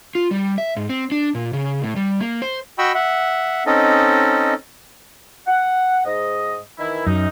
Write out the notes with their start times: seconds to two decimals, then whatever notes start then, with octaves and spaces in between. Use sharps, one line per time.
0.15 F4
0.31 G3
0.58 E5
0.76 G#2
0.90 C4
1.12 D4
1.35 A#2
1.53 C#3
1.82 A2
1.96 G3
2.21 A#3
2.42 C5
2.78 F#4 D#5 G5 B5 C#6 E6
2.95 E5 F#5
3.66 C4 C#4 D#4 A4 D#5
5.47 F#5
6.05 G#2 D#5
6.79 D#3 E3 E4
7.07 F#2 D#4